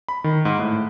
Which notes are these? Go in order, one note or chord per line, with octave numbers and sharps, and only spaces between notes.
B5
D#3
G#2
A2